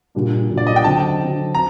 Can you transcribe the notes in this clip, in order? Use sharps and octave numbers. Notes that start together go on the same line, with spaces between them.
A#2 G3 D4 F#4
A#2 G3 D4 F#4
D5
D#5
G5
D3 F#3 C4 A5
D3 F#3 C4
F#3 C4 A#5